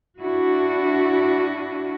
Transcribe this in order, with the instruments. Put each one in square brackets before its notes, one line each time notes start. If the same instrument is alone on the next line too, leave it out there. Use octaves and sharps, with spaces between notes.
[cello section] D4 E4 F#4